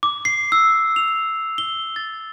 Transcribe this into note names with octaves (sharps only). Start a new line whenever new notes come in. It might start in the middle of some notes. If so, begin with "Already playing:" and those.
D6
C7
E6
F7
G7
A6